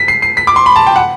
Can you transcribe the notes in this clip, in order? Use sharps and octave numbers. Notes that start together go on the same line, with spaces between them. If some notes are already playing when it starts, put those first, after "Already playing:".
Already playing: B6
C7
C7
B6
D6
C6
B5
A5
G5
F#5